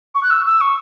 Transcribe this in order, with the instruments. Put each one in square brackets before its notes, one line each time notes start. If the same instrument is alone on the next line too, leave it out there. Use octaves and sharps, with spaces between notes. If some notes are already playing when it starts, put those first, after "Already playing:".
[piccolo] C#6
F#6
E6
E6
C#6